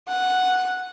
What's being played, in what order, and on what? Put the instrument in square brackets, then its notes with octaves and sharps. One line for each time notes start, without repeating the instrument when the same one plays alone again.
[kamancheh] F#5